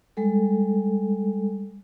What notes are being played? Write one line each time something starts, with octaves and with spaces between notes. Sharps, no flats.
G3 G#3 A4